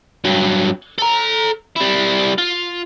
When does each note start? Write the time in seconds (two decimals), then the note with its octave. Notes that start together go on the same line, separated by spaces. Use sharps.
0.24 G2 F#3
0.98 A4 A#5
1.76 G3 E4
2.38 F4